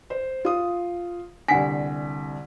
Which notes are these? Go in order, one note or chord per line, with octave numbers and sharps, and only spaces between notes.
C5
F4 D#6
C2 D3 F#5 G#5 B6